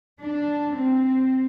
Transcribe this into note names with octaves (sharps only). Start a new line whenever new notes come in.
D4
C4